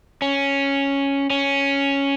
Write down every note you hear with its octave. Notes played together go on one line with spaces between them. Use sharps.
C#4
C#4